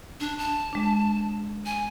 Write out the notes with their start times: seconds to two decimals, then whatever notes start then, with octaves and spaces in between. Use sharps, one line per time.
0.20 D4
0.38 A5
0.73 G#3 D4
1.66 G#5